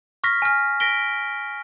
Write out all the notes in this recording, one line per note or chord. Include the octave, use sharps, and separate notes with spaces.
C#6 F6 A#6 B6
G#5 F6
A#6 B6 D7 G7